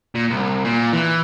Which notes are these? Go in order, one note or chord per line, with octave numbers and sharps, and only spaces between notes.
A#2
C2
A#2
E3